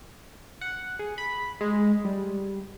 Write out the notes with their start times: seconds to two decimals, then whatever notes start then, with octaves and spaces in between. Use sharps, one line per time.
0.61 F#5
0.99 G#4
1.18 B5
1.61 G#3
2.05 G3